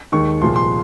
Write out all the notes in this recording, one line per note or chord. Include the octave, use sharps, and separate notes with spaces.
D#2 D#3 G#3 C#6
C2 A#2 F3 G#3 C6
C6